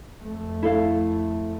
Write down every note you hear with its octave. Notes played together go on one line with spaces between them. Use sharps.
F2 A3
E4 A4 F5